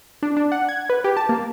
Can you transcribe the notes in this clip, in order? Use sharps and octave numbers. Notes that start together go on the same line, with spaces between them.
D4
D4
F#5
G#6
B4
G4
A5
A#3